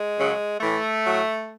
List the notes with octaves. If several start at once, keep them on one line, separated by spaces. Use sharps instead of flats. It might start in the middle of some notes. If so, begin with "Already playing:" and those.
Already playing: G#3
F#2 C#3 F#3
A2 E3 A3
A2 F#3